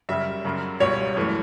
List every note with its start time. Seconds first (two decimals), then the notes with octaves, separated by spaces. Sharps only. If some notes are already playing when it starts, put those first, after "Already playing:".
0.09 F#2 C#3 G3 E5
0.45 F#2 C#3 F#3
0.80 C#2 B2 G3 C#5
1.16 F#2 E3 A3